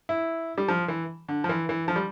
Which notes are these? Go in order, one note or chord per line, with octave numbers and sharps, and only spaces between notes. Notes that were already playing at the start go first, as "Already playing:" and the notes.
E4
G3
F3
E3
D3
F3
E3
E3
F3
G3